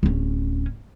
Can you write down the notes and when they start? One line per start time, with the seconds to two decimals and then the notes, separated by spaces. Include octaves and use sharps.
0.03 D1 C#4